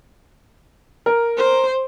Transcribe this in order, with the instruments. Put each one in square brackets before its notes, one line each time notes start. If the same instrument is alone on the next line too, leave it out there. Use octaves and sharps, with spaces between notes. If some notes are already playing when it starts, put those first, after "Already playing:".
[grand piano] A#4
[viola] C5